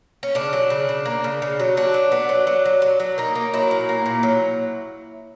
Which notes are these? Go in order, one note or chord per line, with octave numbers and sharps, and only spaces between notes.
C#4
C#3 D4
F#3
C#3
C#3
A#3
C#3
C#3
F#3
F#3 D4
F#3
B3
F#3
F#3
F#3
F#3
F#3
A#3 D#4
A#3
F#3 E4
A#2
A#3
A#2
F#3